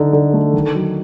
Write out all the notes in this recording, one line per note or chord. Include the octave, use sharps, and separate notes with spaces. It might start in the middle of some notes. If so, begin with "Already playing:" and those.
Already playing: D3 D#4
D3
A3
D#3
F#3